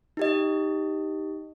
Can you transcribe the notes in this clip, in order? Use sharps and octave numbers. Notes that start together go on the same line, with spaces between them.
D#4 G4 D#5